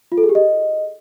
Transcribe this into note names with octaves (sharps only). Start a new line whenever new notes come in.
F4
A4
G#4
G4
D#5